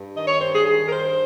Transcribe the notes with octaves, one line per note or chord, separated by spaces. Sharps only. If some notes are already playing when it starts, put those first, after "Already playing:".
Already playing: G2
D#3 D#5
C#5
G2 C5
G#4
D#3 G#4
A#4
G2 C5